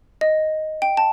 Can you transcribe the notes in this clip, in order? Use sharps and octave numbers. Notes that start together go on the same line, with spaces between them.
D#5
G5
A5